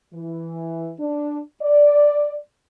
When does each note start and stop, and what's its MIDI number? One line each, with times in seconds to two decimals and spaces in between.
0.13 0.92 52
0.98 1.39 62
1.60 2.34 74